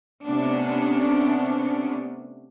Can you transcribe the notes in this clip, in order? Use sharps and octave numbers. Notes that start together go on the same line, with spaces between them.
C3 A3 B3 C#4 D4